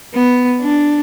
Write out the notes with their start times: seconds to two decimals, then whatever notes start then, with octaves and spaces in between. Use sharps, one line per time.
0.14 B3
0.61 D4